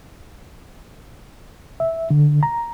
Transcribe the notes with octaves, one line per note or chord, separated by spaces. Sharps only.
E5
D3
A#5